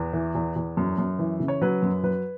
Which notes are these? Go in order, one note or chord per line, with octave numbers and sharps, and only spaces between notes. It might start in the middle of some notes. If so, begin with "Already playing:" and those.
Already playing: E2 B4
E3
E2
E2
F#2
F#2
E3
C#3
C#5
F#3 B4
F#2
F#3 B4